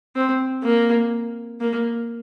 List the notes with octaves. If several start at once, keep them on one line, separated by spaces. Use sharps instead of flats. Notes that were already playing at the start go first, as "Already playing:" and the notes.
C4
A#3
A#3